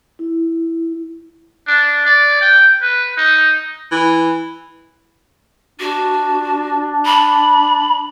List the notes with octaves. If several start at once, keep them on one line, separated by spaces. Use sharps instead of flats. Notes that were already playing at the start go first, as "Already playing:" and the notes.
E4
D4
D5
G5
B4
D#4
E3
D4 F#4
B5